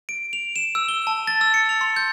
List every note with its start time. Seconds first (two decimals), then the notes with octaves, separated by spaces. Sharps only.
0.09 D7
0.33 F7
0.56 E7
0.75 E6
0.88 G7
1.07 A5
1.27 A6
1.41 E6
1.54 C#7
1.69 F7
1.81 C6
1.96 G6